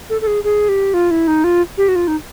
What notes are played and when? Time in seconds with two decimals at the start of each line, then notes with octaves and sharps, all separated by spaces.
0.10 A4
0.21 A4
0.27 G#4
0.44 G#4
0.69 G4
0.94 F4
1.11 E4
1.28 D#4
1.44 F4
1.78 G4
1.88 F#4
1.96 F4
2.08 D#4